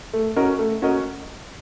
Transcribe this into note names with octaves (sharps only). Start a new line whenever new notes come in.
A3
C#4 F#4 A#4 D#5
A3
C#4 F#4 A#4 D#5